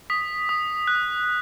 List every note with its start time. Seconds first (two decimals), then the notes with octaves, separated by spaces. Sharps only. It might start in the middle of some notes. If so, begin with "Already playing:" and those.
0.10 D#6 B6
0.49 D#6
0.87 F#6